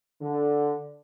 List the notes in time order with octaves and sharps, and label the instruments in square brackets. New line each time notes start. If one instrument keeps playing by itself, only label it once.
[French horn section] D3